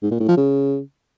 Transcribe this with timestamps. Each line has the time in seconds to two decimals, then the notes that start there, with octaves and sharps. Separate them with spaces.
0.02 G#2
0.11 A#2
0.20 A2
0.28 F3
0.37 C#3